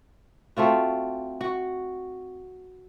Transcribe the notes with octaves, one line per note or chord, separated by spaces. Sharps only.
A3 C4 F4 F#4
F#4